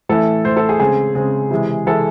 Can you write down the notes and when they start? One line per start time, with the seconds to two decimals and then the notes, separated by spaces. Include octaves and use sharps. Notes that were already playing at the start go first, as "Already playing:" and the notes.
0.09 A2 E3 A3 A4
0.45 A2 E3 A3 C5
0.57 A4
0.69 G#4
0.80 C#3 G#3 C4 G#4
1.15 C#3 G#3 C4
1.51 C3 E3 G#3
1.86 C3 E3 G#3 A4